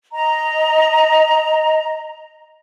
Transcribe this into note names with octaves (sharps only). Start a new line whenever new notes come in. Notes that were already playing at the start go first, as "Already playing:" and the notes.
D#5 A#5